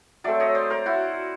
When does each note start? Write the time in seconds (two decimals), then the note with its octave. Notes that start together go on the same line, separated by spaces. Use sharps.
0.24 F#3 A3 C4 D5 E5
0.40 C#5 D#5
0.55 C5 D5
0.70 A#4 C5
0.86 E4 F#4